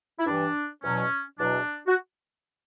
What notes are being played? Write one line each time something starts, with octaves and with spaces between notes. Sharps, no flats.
E4
G2 E3 G3 D4
E2 B2 F#3 C#4
E2 B2 F#3 D4
F#4